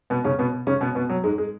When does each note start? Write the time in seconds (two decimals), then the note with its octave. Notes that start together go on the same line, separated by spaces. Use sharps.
0.10 B2 B3
0.24 C#3 C#4
0.39 B2 B3
0.67 C#3 C#4
0.81 B2 B3
0.95 B2 B3
1.09 F#3
1.24 G#2 G#3
1.38 G#3